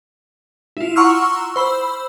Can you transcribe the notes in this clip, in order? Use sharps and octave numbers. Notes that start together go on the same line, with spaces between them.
E4 F4
F#5 A#5 C6 C#6 E6 F6
C5 B5 E6